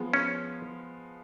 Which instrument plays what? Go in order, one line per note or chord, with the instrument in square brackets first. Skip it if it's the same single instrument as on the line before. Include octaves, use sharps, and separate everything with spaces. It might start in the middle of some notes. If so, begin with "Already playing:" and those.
Already playing: [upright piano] F3 G#3 B3
[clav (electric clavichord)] C#4